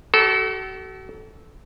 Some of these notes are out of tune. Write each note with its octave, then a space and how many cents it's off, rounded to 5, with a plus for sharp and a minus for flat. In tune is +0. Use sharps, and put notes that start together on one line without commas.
F#4 +45 A4 -15